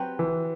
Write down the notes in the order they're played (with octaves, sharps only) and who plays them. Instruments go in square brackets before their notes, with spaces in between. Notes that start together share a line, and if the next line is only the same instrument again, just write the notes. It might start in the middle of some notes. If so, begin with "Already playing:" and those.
Already playing: [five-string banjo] F#3 C4 G4 B4
[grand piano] E3